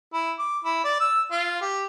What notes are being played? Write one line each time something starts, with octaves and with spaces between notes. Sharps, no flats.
E4
D6
E4
D5
E6
F4
G4